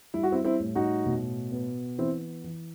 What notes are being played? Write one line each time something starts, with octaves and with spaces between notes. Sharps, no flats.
G3 E4
F#4
C4 E4
C4 E4
A2
D#4 F#4
B2
B3
E3 C4 E4
E3